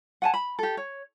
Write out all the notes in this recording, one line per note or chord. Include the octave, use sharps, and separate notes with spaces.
F#5 G#5 A5
B5
G4 A4
C#5